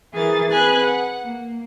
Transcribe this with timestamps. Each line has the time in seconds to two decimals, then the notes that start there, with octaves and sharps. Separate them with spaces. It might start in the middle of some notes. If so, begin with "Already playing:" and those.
0.14 E3 G#4 A#4 A6
0.50 C4 G#4 B4 G#5 F#6
0.82 F#5
1.22 A#3